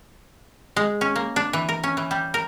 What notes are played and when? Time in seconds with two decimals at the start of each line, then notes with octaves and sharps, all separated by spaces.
0.76 G#3
1.01 C#4
1.16 A#3
1.36 D4
1.53 E3
1.69 A#4
1.83 C#4
1.97 E3
2.11 G3
2.34 A#4